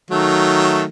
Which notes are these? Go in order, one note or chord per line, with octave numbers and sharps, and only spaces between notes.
D#3 F#3 A3